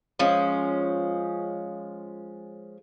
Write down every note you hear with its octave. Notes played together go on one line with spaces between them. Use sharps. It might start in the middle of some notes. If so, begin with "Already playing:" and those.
F3 G#3 C#4